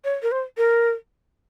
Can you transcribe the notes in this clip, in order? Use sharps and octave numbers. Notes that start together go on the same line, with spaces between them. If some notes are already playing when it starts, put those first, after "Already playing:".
C#5
A#4
C5
A#4